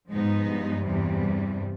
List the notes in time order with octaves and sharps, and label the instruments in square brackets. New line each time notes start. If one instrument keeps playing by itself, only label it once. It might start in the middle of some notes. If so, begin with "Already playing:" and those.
[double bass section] G#2 [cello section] F3 G#3 B3 D#4
[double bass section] G2
[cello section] E2 C3 E3 G3
[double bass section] G2